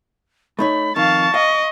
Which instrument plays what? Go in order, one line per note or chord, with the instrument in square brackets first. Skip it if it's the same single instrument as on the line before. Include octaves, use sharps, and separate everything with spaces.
[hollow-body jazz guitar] A3 D#4 C#5 [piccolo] B5
[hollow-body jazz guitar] F2 D#3 [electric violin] F5 A5 [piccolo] C#6
[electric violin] D#5 [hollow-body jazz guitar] F5